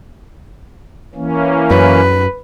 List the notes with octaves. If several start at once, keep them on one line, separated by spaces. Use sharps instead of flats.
E3 A#3 C#4
F#2 B4